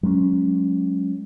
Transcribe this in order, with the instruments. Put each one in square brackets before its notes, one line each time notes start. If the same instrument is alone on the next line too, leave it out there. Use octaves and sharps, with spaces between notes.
[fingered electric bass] F#3 G#3 B3 C#4